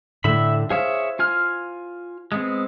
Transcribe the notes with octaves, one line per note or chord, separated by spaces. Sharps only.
A2 D3 A3 E5 B5
G#4 C5 C#5 E5 F5
F4 G#5 F6
G#3 B3 C4